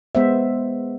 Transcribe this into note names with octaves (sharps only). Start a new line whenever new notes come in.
G#3 B3 C5 E5